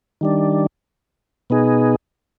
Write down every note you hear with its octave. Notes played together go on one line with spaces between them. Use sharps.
D#3 G3 D4
B2 B3 D#4 G#4